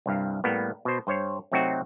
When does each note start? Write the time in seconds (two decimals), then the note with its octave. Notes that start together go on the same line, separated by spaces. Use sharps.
0.06 C2 G2 F5
0.44 A2 G3 A#3 B3
0.85 B2 C5
1.07 G2 C5 C#5
1.52 C3 F#3 A3 C4 D#4 F#4